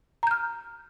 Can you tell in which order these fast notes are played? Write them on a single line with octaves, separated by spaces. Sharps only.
A#5 G6 F6